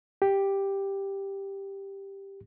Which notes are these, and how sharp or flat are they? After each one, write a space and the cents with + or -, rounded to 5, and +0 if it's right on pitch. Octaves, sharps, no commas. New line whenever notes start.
G4 +5